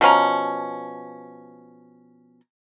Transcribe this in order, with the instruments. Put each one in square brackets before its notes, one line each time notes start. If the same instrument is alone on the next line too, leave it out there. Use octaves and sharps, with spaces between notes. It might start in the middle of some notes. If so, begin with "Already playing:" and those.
[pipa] B2 F3 C#4 A#5